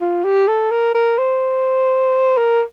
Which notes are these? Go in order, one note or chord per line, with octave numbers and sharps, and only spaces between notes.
F4
G4
A4
A#4
A#4
C5
A#4